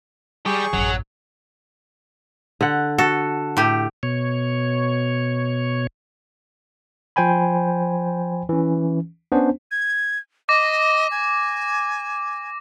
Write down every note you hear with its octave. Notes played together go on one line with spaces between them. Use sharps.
G3 G4 G#4 C#6
A1 F#2 F#3
D3 F#5
F#4 A4
A2 G4
B2 C#5
F3 C5 G5 G#5 B5
E3 C#4
B3 C#4 D4 C5
G#6
D#5 D6 A#6
G#5